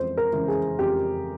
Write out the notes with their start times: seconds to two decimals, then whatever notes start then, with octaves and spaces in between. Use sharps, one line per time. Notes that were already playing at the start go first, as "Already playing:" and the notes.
Already playing: F2 E3 G#3 C5
0.17 A#4
0.33 C#3 E3 G#3
0.48 G#4
0.79 F2 G4